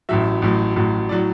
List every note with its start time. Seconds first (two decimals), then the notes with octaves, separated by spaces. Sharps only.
0.09 A1 A2 F#3 E5
0.42 A1 A2 F#3
0.76 A1 A2 F#3
1.09 A2 F#3 D5